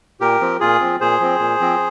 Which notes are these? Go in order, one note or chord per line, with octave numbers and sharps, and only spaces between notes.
A#2 G4 A#4
F3 C4
A#2 F4 G#4
F3 C4
A#2 G#4 C5
F3 C4
A#2
F3 C4